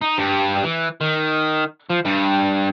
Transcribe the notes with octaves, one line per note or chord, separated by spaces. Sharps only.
D#4
G2 G3
E3
D#3
F3
G2 G3